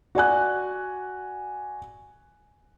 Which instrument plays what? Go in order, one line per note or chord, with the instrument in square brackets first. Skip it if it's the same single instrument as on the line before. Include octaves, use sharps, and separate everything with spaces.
[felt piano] F#4 D5 G#5 F#6